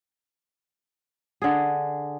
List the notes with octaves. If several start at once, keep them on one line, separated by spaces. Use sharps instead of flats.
D3 G#4